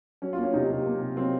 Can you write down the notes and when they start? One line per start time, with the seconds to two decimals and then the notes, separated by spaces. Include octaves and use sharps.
0.22 F#3 C#4
0.33 F4
0.38 A#3
0.43 C#4
0.53 C3 D#4
0.70 C3
0.86 A#3
1.01 C3
1.17 F#3 C4